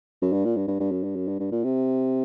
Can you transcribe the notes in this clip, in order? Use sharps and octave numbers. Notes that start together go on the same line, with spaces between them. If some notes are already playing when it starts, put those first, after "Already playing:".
F#2
G2
A#2
G2
G2
G2
F#2
G2
F#2
G2
G2
A#2
C3